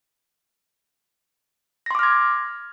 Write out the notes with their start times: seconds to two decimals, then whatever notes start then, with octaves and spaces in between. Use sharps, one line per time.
1.86 A#6
1.91 C6
1.95 D6
1.99 F6
2.03 G#6